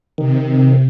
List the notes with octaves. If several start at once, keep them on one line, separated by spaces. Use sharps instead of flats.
C3 D#3